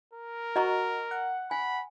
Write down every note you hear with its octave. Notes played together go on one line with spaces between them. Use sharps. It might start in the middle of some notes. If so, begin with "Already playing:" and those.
A#4
F#4 D#5 A#5 C#6
F#5
G#5 B5